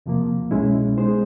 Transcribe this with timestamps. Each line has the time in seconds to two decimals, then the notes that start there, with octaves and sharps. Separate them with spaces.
0.06 E2 C3 F3 A#3
0.51 C2 B2 G#3 C#4 E4
0.98 G#3 B3 D#4 G#4 C5